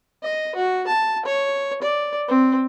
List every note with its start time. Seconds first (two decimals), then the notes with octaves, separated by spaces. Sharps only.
0.23 D#5
0.55 F#4
0.87 A5
1.25 C#5
1.82 D5
2.28 C4